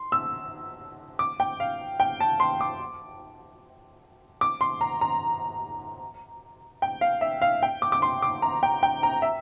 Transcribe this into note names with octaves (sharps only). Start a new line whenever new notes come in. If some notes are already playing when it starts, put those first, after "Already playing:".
Already playing: C6
E6
D6
G5
F5
G5
A5
C6
D6
D6
C6
A#5
A#5
G5
F5
E5
F5
G5
D6
D6
C6
D6
A#5
G5
G5
A#5
E5